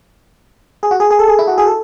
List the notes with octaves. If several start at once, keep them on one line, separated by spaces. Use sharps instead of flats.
G#4
F#4
G#4
G#4
A4
G#4
E4
F#4
G#4
A4